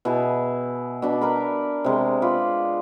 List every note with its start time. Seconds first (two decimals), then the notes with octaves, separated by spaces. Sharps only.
0.05 B2 E4 G#4 A5
1.02 B2 D4 B5
1.21 A#4 B4 A#5 B5
1.84 C3 G#3
2.22 F4 B4 D5